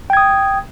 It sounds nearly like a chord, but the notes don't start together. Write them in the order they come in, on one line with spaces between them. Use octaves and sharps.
G5 G#6 D#6